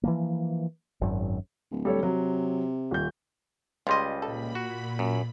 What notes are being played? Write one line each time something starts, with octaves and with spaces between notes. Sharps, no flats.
E3 F3 A#3
G#1 F#2
D1
G3 A4 C#5
C3 F#3
D#1 G6
C#2 G3 F4 D#5
A#2 A4 B5
F#4
F#2